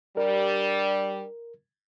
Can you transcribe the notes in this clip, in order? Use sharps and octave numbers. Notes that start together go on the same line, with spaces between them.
G3 D4 A#4